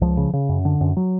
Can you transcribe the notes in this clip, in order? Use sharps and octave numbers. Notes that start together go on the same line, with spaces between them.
C#2 F3
C#3
C#3
F#2
D3
F#2
F#3